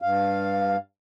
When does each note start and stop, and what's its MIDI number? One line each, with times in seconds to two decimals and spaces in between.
0.02 0.76 43
0.02 0.76 77